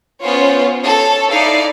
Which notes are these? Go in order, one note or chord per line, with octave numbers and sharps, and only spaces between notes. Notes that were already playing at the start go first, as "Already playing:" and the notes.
B3 C#4 F4 C5 C#5
A4 C#5
D#4 E4 D5 F5